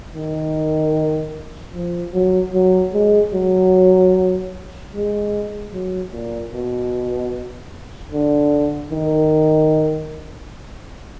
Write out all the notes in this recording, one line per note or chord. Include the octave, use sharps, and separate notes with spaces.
D#3
F3
F#3
F#3
G#3
F#3
G#3
F#3
A#2
B2
D3
D#3